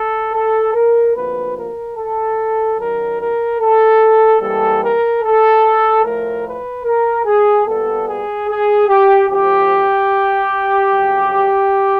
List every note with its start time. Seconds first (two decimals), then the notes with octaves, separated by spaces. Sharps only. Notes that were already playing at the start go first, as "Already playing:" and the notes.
Already playing: A4
0.33 A4
0.74 A#4
1.15 D2 C3 F3 A#3 B4
1.56 A#4
1.96 A4
2.77 F#2 D#3 F#3 A#4
3.19 A#4
3.60 A4
4.40 G#2 E3 G3 A#3 A4
4.81 A#4
5.22 A4
6.03 A2 F3 A3 A#4
6.44 B4
6.84 A#4
7.25 G#4
7.66 A#2 G3 B3 A4
8.07 G#4
8.48 G#4
8.88 G4
9.29 D2 C3 F3 G4
10.92 F2 C#3 F#3